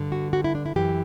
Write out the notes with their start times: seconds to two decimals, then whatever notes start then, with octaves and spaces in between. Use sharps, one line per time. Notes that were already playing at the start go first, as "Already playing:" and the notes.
Already playing: G2 D3
0.12 F#4
0.33 F#4
0.44 E4
0.55 D4
0.66 E4
0.76 F#2 E3 G4